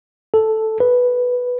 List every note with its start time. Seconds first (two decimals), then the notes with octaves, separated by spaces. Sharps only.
0.34 A4
0.80 B4